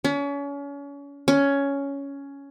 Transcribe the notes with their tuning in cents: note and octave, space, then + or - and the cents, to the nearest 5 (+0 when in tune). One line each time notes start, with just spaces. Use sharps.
C#4 +35
C#4 +10